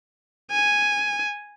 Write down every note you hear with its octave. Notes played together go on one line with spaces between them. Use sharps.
G#5